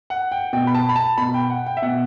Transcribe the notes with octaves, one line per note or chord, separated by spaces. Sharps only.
F#5
G5
B2 G5
B5
A5
B5
A5
B2 B5
G5
F#5
G5
E5
B2 F#5